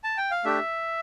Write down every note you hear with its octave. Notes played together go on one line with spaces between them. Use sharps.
A5
G5
F5
A3 D4 G4 E5